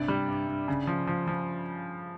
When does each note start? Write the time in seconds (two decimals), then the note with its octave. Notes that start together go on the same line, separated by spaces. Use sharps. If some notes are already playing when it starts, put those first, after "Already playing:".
Already playing: G2 C3 D5
0.08 G3
0.28 G2
0.48 G2
0.68 C#3
0.87 F3
1.07 F3
1.28 F3